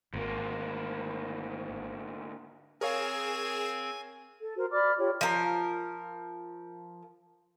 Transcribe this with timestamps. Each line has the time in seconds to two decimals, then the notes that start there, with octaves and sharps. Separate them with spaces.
0.13 G#1 D2 A#3
2.81 C4 G#4 A#4 C#5 F5 G#5 E7
4.41 A4
4.56 F#4 A#4 C5
4.71 D5 B5 D6 F6
4.98 F4 G4 C#5
5.21 F3 A#4